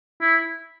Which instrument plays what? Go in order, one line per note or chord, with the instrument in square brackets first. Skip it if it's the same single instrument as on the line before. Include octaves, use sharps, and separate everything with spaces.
[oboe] E4